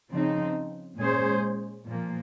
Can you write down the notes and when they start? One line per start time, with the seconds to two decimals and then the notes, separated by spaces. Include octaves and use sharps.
0.10 C#3 F3 C4 D#4
0.98 A#2 G#3 C#4 G#4 C5
1.86 A#2 F3 A#3